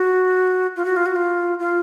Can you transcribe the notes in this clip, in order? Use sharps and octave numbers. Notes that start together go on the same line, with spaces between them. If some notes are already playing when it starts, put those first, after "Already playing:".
Already playing: F#4
F4
F#4
F4
F#4
F4
F4